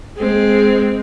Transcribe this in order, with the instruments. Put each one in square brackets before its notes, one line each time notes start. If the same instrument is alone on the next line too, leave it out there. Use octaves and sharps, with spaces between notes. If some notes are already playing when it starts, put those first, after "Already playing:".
[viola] G#3 C4